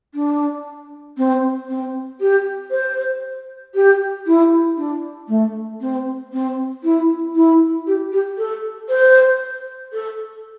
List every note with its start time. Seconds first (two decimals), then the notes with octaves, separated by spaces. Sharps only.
0.14 D4
1.18 C4
1.69 C4
2.21 G4
2.71 C5
3.75 G4
4.27 E4
4.78 D4
5.29 A3
5.81 C4
6.33 C4
6.84 E4
7.35 E4
7.87 G4
8.12 G4
8.38 A4
8.89 C5
9.93 A4